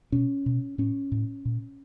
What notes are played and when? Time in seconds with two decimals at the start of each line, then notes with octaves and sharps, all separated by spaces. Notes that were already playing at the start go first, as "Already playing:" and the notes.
0.12 B2 C#4
0.46 B2
0.78 A2 C#4
1.12 A2
1.45 A#2